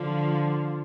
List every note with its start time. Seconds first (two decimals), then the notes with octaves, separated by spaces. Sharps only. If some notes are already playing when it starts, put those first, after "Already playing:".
Already playing: D3 F3 F4